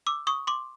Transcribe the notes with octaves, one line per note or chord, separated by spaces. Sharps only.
D6 E6
C#6 D#6
C6 D6